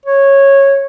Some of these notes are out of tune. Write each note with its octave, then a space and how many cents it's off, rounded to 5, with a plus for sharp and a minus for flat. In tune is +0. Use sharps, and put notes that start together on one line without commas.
C#5 -10